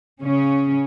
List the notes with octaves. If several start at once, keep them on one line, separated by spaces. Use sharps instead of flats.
C#3 C#4